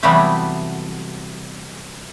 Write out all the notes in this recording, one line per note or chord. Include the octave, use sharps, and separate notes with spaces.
C3 E3 F#3 G3 A3 B3